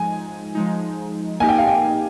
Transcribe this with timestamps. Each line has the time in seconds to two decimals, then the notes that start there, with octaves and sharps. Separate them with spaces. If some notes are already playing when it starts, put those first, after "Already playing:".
Already playing: F3 G#3 D#4 G#5
0.55 F3 G#3 D#4
1.40 A#3 D#4 G4 G#5
1.49 G5
1.58 F5
1.67 G5